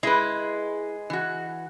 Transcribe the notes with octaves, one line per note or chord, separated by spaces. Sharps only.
G#3 E4 B4
E3 F#4